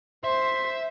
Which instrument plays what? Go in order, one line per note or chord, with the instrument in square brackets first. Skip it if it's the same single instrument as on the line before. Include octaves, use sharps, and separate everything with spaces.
[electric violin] C5 C6 [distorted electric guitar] E5